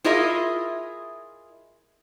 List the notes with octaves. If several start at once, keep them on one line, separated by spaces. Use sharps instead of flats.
E4 F4 G#4 A#4 D#5 E5